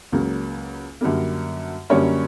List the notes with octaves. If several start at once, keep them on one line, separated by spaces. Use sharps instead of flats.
C#2 C#3 F#3 A#3
F#2 D3 G3 A#3
F#2 D3 G3 A#3 C#4 C#5